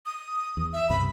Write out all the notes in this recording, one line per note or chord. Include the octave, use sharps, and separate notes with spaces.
D#6
E2
E5
C#2 G2 C3 B5